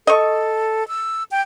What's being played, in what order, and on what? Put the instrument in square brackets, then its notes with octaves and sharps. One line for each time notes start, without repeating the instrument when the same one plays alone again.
[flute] A4 [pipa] D#5 C#6
[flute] E6
G5